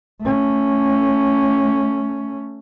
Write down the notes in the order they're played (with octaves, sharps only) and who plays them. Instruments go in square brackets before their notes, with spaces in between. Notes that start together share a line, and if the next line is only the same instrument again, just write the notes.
[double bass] A3 C#4